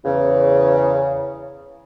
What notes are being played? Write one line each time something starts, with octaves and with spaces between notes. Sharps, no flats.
E2 C#3